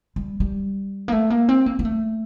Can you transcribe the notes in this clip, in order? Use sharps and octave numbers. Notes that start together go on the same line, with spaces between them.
G3
G3
A#3
A3
A#3
C4
A#3
A#3
A3